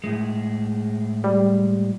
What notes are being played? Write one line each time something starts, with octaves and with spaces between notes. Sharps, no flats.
A2 G#3
G3